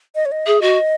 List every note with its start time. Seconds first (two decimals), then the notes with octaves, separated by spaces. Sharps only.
0.15 D#5
0.25 C#5
0.31 D#5
0.46 G#4 E5
0.60 F#4 D#5